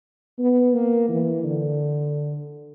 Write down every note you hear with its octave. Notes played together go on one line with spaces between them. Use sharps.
B3
A#3
E3
D3